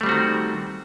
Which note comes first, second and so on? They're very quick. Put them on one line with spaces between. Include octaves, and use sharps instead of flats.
A3 G3 C4 F#4 D#3